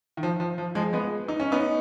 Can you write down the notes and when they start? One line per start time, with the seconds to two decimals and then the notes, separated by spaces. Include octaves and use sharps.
0.17 D#3
0.23 F3
0.40 F3
0.58 F3
0.75 F3 G#3
0.93 G#3 B3
1.28 D#4
1.40 C#4
1.52 B3 D#4